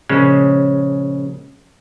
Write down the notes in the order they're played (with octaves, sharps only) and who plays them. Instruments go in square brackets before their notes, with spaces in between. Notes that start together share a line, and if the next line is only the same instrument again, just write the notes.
[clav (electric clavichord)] A#1 C#3 G#3 C#4